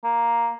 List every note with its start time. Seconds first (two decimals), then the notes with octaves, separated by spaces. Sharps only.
0.04 A#3